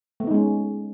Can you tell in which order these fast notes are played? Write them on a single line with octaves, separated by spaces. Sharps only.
A3 B3 D#4 G#3 C#4